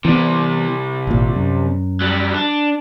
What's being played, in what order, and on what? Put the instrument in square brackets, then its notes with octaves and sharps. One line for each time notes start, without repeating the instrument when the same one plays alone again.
[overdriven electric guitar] C3 G3 [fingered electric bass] E3 B3
[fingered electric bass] G#1 A#2
F#2
[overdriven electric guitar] F#3 G3
D4